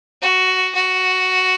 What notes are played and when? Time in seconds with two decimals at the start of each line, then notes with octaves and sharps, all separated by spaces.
0.22 F#4
0.75 F#4